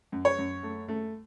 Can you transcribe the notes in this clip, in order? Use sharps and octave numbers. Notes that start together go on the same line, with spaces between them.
F#2
C#5
F#2
A3
A3